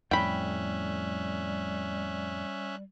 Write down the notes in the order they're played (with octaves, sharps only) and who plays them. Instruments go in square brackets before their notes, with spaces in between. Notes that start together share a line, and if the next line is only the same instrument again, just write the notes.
[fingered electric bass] F2 A2 [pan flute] G3 [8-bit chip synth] C#4 E5 F#6 [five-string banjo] G5 B5